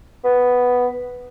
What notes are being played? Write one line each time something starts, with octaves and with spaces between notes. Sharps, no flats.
B3